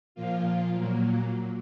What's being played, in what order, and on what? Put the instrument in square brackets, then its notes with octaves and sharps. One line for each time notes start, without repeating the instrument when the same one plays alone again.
[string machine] A#2 F3 A#3 F4
A#2 F#3 A#3